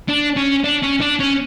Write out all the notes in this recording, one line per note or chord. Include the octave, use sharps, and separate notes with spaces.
D4
C#4
D4
C#4
D4
C#4